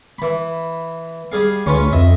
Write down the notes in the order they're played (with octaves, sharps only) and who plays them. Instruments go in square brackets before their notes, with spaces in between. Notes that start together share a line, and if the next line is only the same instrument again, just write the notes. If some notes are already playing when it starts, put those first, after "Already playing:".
[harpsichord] E3 B5
G3 G#4 F5
[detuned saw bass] D2 [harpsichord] C#4 F4 B4
[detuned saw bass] F2 [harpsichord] D#5 E5